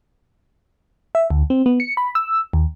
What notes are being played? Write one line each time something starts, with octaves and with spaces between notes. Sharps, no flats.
E5
D2
C4
B3
C#7
B5
E6
D#2